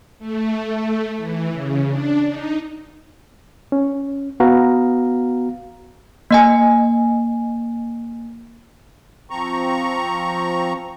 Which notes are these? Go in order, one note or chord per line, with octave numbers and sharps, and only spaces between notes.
A3
A3
E3
C#3
D4
D#4
C#4
B3 F#4 F5 A#5
A#3 D#5 G#5
F3 C4 A#5 C#6